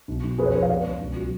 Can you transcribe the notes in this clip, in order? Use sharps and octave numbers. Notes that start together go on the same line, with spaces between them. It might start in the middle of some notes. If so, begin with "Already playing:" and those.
B1
B1
F2 G#4 B4
C#5
F3 G#4 B4
F5
B2 B4 D5
C#2
B1
F#3